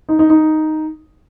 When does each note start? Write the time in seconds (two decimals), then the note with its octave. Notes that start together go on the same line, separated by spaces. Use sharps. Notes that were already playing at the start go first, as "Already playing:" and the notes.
0.09 D#4
0.19 D#4
0.30 D#4